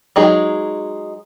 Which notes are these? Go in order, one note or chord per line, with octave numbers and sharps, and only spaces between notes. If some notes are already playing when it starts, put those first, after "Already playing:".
F#3 G#3 D#4 G#4